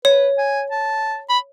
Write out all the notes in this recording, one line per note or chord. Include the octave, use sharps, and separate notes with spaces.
B4 C#5
G#5
A5
B5